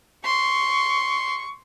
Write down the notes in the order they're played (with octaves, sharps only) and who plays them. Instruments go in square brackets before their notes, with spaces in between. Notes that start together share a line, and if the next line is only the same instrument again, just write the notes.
[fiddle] C6 [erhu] C#6